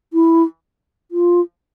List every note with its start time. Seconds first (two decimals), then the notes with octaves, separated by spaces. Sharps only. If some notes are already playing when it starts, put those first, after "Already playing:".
0.13 E4
1.11 F4